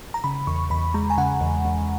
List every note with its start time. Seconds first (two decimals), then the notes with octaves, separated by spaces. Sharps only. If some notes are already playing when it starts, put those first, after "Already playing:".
0.14 A#5
0.24 C#3 B5
0.47 E2 C#6
0.70 E2 B5
0.94 G#3 A#5
1.10 G#5
1.18 C#3 F#5
1.41 E2
1.65 E2